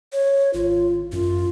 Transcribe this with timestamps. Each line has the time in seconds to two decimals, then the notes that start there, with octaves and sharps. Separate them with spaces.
0.12 C#5
0.54 G#1 F4
1.12 F#2 F4